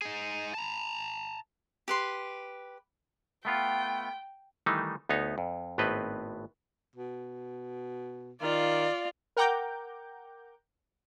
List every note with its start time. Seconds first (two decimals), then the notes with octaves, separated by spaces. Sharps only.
0.02 D#4 G#4
0.54 A5 A#5
1.88 G4 B4 C6
3.45 A3 B3 F4 G5
4.66 D#3 E3 G3 A3 D#4
5.09 D2 B3 D#4 C#5
5.38 F2
5.78 G#1 A2 B3 C4 B4 D#5
6.96 B2
8.41 D#3 F4 D5 F5
9.37 A#4 F#5 G5 A#5 D6 G6